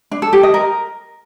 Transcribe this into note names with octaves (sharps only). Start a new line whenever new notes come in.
D4
A4
G4
D#5
A#4